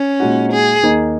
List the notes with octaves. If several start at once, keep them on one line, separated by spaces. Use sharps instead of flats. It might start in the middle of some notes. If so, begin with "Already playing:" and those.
Already playing: C#4
A#2 G#3 D#4 F#4
G#4
D#2 D#3 A#3 D#4